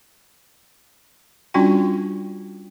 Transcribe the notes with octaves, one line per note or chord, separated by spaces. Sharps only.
G3 C#4 D4 F4 F#4 G5